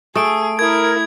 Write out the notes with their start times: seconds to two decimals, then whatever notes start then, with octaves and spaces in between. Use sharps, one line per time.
0.16 A3 G#4 D#6 D7
0.59 E4 A#4 D#6 G#6